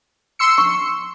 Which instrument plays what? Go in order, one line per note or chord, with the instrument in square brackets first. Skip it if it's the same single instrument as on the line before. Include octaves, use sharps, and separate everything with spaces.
[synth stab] C6 E6 C#7
[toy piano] C#6